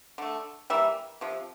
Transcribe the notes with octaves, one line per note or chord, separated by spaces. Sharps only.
D3 A3
E3 G3 A#3 E5
C3 F3